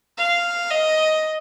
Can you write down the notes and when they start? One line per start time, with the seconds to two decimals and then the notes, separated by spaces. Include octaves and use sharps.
0.18 F5
0.71 D#5